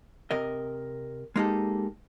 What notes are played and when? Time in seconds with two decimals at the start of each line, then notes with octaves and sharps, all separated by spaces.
0.31 C3 A#4 D#5
1.36 G#3 A#3 D#4 G4 A4